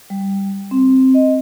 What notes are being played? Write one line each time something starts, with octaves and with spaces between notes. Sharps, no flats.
G3
C4
D#5